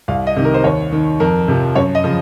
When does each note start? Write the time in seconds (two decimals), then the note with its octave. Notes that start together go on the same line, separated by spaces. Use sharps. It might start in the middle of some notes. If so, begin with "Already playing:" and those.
0.08 C2 F5
0.27 D#5
0.36 C3 D#3
0.45 A#4
0.54 C5
0.64 D#2 C#5
0.92 D#3
1.20 F2 A#4
1.48 C3 F3
1.76 F#2 C#5
1.95 D#5
2.04 C#3 F3